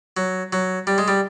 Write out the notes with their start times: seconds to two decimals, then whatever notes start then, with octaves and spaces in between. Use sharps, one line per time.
0.17 F#3
0.53 F#3
0.87 G3
0.98 G#3
1.08 G3